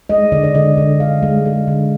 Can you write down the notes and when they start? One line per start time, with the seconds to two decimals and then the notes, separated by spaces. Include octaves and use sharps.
0.09 G#3 D#5
0.32 D3 D5
0.44 D5
0.54 D3 D#5
0.77 D3
1.00 D3 F5
1.23 G#3
1.46 G#3
1.68 D3